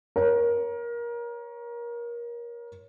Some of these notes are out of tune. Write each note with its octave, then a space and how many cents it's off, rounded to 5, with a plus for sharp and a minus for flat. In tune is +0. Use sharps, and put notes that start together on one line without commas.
A#4 +25 C#5 +0